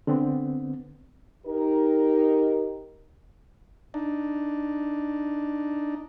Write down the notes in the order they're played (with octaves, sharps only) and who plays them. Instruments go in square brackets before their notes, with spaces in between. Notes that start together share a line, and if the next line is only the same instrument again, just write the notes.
[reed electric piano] D3 B3 C4
[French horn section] D#4 G4 A#4
[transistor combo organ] D4 D#4